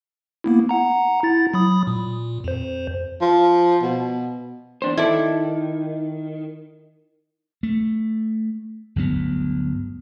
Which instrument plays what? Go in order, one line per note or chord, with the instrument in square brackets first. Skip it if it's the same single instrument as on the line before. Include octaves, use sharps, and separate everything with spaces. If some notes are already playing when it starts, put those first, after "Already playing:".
[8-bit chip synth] A#3 B3 E4
F#5 A#5
E4 A6
F#3 B5 D#6
A#2
F2 C5
[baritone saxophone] F3
B2
[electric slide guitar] E2 D4 C5
[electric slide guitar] D#3 [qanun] E4 A4 D5
[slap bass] A3
G1 D2 F#3 B3